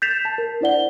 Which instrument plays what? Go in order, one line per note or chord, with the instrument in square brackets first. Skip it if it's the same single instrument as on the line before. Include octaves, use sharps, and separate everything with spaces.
[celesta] G6 A6 B6 C7 E7 F7
A5
A#4
D4 E4 C5 D5 F#5 G7